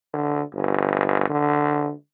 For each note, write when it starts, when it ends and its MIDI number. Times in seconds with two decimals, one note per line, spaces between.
0.14 0.43 50
0.54 1.25 31
1.30 1.92 50